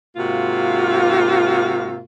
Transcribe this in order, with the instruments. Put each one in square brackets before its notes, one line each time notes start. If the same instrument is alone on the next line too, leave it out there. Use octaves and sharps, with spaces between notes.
[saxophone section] G#2 C3 A#3 F4 F#4